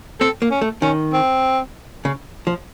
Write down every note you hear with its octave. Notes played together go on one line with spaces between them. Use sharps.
C4 A4
A#3
C#4
A3
D#3 C#4
C4
C#3
F3